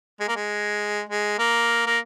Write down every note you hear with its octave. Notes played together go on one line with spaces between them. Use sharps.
G#3
A#3
G#3
G#3
A#3
A#3